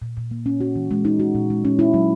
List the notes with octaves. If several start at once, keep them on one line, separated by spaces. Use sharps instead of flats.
A#2
A#2
A#3
C#4
F#4
E3
G#3
D#4
F#4
A#2
G#3
C#4
E4
F#3